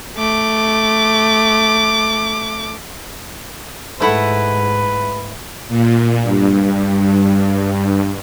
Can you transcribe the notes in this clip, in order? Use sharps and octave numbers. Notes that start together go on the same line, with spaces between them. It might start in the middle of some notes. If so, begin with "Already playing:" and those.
A3 D6
G#2 A3 E4 B4 F#5
A#2
G2